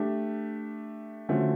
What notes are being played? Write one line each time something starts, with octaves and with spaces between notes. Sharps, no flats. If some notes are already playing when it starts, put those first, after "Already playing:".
Already playing: A3 D4 G4
D3 F3 A3 C#4 F#4